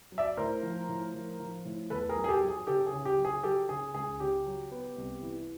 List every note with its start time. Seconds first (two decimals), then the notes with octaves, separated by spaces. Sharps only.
0.12 F#3
0.18 D5 E5
0.37 A2 A#4 C5
0.63 F3
0.89 A2
1.14 F3
1.40 F3
1.65 A2
1.90 E2 A4 B4
2.09 G#4 A#4
2.16 F#3
2.24 G#4
2.28 G4 A4
2.41 F#3
2.48 G#4
2.67 C#3 G4 A4
2.87 G#4
2.92 C#3
3.05 G4
3.18 F#3
3.25 G#4
3.43 F#3 G4 A4
3.69 C#3 G#4
3.94 C#2 G#4
4.20 C#3 G4
4.46 F#3
4.71 B3
4.96 C2
5.22 E3